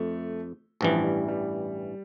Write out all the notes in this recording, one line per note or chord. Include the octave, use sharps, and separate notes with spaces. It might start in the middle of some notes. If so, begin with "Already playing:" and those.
Already playing: F2 A3
A1 G2 E3 F3
G3
G3